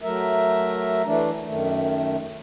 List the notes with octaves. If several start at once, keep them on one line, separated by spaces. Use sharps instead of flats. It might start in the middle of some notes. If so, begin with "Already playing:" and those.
F#3 A3 A#4 E5
E3 A3 D4
F#2 D#3 A3